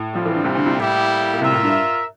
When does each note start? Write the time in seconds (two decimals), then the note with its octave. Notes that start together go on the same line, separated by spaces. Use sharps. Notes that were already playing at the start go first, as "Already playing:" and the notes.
Already playing: A2
0.12 F3 G3 C4 F4
0.25 E3
0.35 D3
0.44 C2 C3
0.55 D2 D3
0.66 C2 C3
0.77 A2 G3 A#3 E4 G4
1.33 A#2
1.41 C2 C3 F4 A#4 E5
1.52 A2
1.63 G2